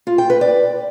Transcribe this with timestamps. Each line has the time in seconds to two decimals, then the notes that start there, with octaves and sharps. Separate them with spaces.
0.07 F4
0.18 G5
0.30 B4
0.41 D5